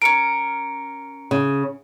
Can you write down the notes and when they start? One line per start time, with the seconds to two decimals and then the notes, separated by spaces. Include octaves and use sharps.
0.02 C#4 A#4 C#7 D7
1.31 C#3